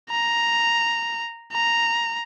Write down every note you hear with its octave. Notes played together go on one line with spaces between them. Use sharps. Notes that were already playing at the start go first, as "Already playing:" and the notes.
A#5
A#5